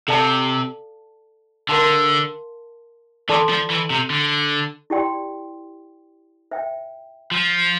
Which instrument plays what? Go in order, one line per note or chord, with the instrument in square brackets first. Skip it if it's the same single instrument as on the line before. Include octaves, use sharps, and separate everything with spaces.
[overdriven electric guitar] C3 [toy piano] A4 D5 F5 A5
[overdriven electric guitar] D3 [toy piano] A#4 F5 A5 C6
[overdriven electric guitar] E3 [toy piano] A4 D5 A5 C6
[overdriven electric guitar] F3
E3
C3
D3
[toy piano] E4 G4 D5 G5 C6
C5 E5 G5
[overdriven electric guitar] F3